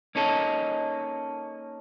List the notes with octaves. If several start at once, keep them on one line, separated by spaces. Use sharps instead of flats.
A#3 C#4 D#4 A4